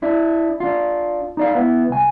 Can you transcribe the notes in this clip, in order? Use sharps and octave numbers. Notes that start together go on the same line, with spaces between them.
D4 E4
D4 F4
D#4 D5 F5
B3 E4
C2 G#5